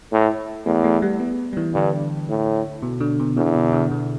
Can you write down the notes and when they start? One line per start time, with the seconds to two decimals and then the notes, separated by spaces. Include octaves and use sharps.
0.12 A2
0.66 E2 A3
0.84 A3
1.02 G3
1.20 B3
1.53 G3
1.57 E3
1.74 G2 D3
2.29 A2
2.82 B2
3.00 D3
3.20 B2
3.37 E2 D3
3.55 B2
3.73 D3
3.91 D3